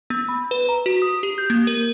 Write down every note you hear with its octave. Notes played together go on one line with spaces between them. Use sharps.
B3
B5
B4
A#5
F#4
D#6
G4
G6
A#3
A#4